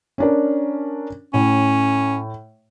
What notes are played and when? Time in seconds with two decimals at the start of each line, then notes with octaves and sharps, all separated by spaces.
0.18 C#4 D4 A#4
1.34 A2 C#4